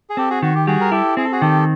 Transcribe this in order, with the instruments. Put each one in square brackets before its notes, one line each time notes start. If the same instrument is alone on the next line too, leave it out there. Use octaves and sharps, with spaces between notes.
[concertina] G#4
[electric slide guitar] C4 [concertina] G4 A4
[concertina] F#4 G#4
[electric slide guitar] D#3 [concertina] F#4
[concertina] G4
[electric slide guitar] G3 [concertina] F#4 G#4
[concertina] A#4
[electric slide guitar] E4 [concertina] G4 A4
[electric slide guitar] C4 [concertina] G#4
[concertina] A4
F#4 G#4
[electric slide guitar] D#3 [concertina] G4 A4